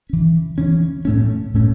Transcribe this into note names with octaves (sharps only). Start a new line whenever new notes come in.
E3 C#4
E3 C#4
A2 A3 C#4
A2 A3 C#4